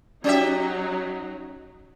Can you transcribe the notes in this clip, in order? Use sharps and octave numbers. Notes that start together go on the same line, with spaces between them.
F#3 C#4 D#4 G4 E5